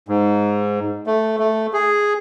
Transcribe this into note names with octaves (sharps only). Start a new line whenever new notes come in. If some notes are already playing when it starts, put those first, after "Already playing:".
G#2
A3
A3
G#4